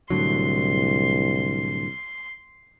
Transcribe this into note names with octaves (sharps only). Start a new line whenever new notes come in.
C2 A2 D3 F#3 C6